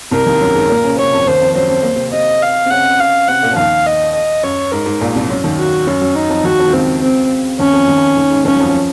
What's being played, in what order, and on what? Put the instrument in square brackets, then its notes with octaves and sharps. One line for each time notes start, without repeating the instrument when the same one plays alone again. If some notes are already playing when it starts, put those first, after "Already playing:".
[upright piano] C2 C3 [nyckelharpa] A#4
[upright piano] D#2 D#3
F#2 F#3
G#2 G#3
A#2 A#3
C#3 C#4
[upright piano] C3 C4 [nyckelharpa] C#5
[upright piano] F2 F3
[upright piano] D#2 D#3 [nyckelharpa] C5
[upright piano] F2 F3
[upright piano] F#2 F#3 [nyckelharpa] C5
[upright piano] C4
A#3
C3 C4
[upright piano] C3 C4 [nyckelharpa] D#5
[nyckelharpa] F5
[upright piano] C4
[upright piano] C#3 C#4 [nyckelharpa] F#5
[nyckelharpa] F5
[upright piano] C3 C4 [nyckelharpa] F#5
[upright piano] A#2 A#3
F3
[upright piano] D#2 D#3 [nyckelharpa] F5
[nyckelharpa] D#5
D#5
[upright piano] F#2 [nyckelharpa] C#5
[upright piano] G#2 [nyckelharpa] A#4
[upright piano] G#2
A#1 A#2
C2 C3
F#2 F#3
D#2 D#3
[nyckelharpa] F#4
[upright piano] F#2 F#3 [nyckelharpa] C#4
[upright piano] F#2 F#3
[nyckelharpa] D#4
[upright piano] F2 F3
[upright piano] D#2 D#3 [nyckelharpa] F#4
[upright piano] F2 F3
D#3
[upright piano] C#2 C#3 [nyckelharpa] C4
[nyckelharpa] C4
[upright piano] D#2 D#3 [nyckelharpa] C#4
[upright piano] F2 F3
D#2 D#3
D#2 D#3
G#2
[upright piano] D#2 D#3 [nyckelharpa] C#4
[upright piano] F#3
F2 F3
F3